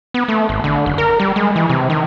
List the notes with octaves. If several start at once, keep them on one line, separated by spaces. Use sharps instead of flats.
B3
A3
G#1
D3
F#1
A#4
G3
G#3
E3
C3
D#3